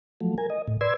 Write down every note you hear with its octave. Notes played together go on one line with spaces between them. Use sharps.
F3 F#3 A3
A#4 G#5
D#5
A2
B4 D5 C6 E6 G#6